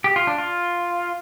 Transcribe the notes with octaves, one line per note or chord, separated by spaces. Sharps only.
G4
F4
D4
F4